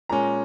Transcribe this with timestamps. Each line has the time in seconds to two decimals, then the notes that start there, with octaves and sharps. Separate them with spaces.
0.09 A#2 G#3 C#4 A#5